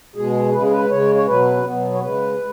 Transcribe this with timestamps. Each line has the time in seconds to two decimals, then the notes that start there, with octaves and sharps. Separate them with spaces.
0.16 B2 G#3 G#4
0.53 C#3 G#3 B4
0.62 G#4
0.71 B4
0.89 C#3 G#3 C#5
1.15 C#5
1.26 B2 F#3 B4
1.57 C#4
1.64 B2 F#3 B3
1.94 C#5
2.01 C#3 G#3 B4
2.37 G#3